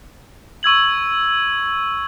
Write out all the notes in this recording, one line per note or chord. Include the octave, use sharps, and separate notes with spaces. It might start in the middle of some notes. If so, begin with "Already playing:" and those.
C#6 E6 G#6 F#7